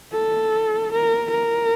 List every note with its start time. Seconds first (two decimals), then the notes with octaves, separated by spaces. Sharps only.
0.12 A4
0.92 A#4
1.31 A#4